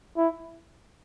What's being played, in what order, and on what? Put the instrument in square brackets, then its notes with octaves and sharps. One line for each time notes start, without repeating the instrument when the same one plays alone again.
[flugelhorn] E4